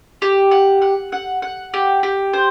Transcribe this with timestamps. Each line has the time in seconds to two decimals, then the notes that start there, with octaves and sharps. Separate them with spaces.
0.22 G4
0.51 F#5
0.82 F#5
1.12 F#5
1.42 F#5
1.74 G4
2.03 G4
2.33 C5